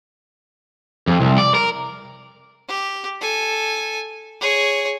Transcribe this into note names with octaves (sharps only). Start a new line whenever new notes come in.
F2
C2
D5
A#4
G4
A4 G#5
G#4 C#5